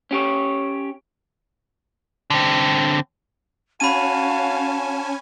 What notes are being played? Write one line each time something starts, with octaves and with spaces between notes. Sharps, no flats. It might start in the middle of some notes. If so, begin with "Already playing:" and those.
C#4 G4 C#5
D3 C4
C#4 F#4 F5 G#5 A5 B5 D#7